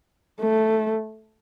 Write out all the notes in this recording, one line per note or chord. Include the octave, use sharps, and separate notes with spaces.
A3